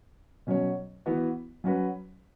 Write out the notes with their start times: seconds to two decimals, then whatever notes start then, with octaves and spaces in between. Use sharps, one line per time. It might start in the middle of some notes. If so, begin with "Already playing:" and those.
0.47 B2 F#3 C#4 F#4 C#5
1.06 E3 B3 F#4 B4
1.64 F#3 C#4 F#4 B4